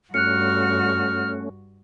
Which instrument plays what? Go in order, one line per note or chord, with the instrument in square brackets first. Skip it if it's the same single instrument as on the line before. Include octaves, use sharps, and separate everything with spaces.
[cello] G2 F#4 [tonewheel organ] A3 C#4 [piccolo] F6 [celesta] F#6 C#7